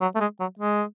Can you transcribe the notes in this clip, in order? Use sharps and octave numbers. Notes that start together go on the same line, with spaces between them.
F#3
A3
G#3
F#3
G#3